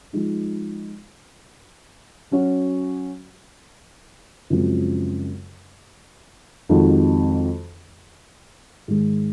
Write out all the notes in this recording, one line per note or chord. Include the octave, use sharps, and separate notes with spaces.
F3 G#3 D#4
F#3 C#4 F#4
F#2 C#3 F3 G#3 C4
F2 D#3 G#3 D#4 F#4
G#2 D#3 G#3